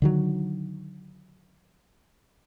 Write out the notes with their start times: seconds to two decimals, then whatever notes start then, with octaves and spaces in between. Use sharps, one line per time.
0.02 D3 D#3 F#3